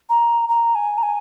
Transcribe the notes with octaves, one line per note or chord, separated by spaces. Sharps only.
A#5
A#5
G#5
A#5
G#5